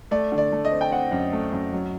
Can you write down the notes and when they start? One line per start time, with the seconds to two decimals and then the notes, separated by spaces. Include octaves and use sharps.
0.11 A3 D5
0.32 D3
0.38 D5
0.52 A3
0.65 D#5
0.72 C4
0.81 G5
0.91 C4 F#5
1.11 F#2
1.33 A3
1.52 F#2
1.72 F#3